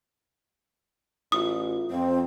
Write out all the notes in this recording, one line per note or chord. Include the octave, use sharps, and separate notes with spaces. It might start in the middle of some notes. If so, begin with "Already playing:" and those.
A1 F4 F#4 D#6
F2 C4